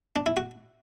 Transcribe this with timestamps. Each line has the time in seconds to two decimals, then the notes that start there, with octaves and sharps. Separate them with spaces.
0.16 D4
0.26 E4
0.37 F#4